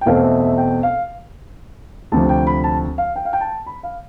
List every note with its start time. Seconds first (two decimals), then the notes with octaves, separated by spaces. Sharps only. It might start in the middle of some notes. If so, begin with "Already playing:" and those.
0.01 G5
0.06 E2 B2 A3 C4 F5
0.23 E5
0.40 E5
0.58 G5
0.83 F5
2.12 D2 C3 F3 A5
2.29 G5
2.47 B5
2.64 A5
2.98 F5
3.16 G5
3.25 F5
3.33 G5
3.41 A5
3.66 B5
3.83 F5